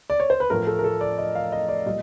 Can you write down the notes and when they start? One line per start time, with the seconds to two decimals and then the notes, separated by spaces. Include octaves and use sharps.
0.10 D5
0.20 C#5
0.30 C5
0.40 B4
0.50 A2 F3 A3 A#4
0.67 A4
0.79 A#4
0.84 A4
1.01 D5
1.18 D#5
1.35 F5
1.52 D#5
1.69 D5
1.86 A#2 G3 D#5